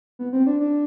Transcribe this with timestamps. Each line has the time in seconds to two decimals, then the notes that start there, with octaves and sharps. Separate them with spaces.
0.19 B3
0.33 C4
0.47 D4
0.60 D4